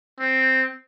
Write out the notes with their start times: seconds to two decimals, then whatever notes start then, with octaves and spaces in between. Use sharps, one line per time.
0.19 C4